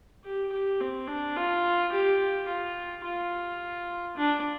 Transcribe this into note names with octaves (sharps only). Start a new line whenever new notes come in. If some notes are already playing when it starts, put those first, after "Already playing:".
G4
G4
C4
D4
F4
G4
F4
F4
D4